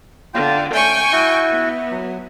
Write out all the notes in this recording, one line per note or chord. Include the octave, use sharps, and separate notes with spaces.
D3 F4 G5
A3 C#4 G5 G#5 C#6
E4 F#4
B3
F#3